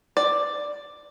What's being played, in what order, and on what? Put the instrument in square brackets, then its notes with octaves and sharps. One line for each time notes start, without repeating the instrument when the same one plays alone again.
[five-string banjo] D5